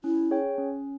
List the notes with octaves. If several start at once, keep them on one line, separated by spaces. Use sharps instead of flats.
C#4 E4
G#4 C#5 G5
C#4